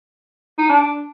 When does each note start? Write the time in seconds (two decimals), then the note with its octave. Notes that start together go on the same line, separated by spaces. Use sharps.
0.58 D#4
0.69 D4